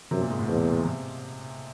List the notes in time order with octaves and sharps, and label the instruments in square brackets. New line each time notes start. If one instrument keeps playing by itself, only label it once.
[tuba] F#2 [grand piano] C3
[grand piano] A#2
G#2
A2
[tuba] E2 [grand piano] B2
[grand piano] C3